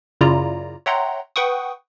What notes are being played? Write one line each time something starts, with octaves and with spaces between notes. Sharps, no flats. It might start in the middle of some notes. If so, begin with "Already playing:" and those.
F#2 C#3 E4 F4 D5 A#5
C#5 E5 F#5 G5 A#5 C6
B4 F#5 G5 C#6 D#6